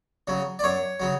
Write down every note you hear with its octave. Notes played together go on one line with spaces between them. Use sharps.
C#3 F#3
D5
F#2 C#5
C#3 F#3